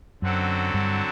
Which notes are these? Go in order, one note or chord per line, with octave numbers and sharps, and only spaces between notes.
F#2 D3 F#3 C4 F#4 A4
G2